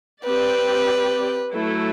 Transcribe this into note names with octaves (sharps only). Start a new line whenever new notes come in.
C4 G4 B4 D5
F#3 A3 E4 A4